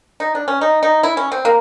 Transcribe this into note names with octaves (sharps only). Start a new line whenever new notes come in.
D#4
D4
C#4
D#4
D#4
E4
C#4
C4
A#3